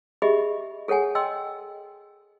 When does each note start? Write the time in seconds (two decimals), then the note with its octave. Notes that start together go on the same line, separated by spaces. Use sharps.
0.22 G4 G#4 D#5 E5 B5
0.88 G#4 A4 C#5 F#5 G#5
1.15 D#5 G5 C6 E6